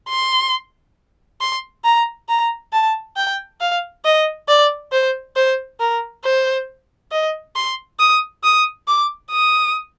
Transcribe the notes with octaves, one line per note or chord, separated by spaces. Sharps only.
C6
C6
A#5
A#5
A5
G5
F5
D#5
D5
C5
C5
A#4
C5
D#5
C6
D#6
D#6
D6
D#6